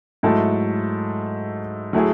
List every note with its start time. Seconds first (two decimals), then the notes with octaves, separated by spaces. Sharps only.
0.23 G#2 F#3 A3 E4 A4
1.93 F#3 A3 E4 G#4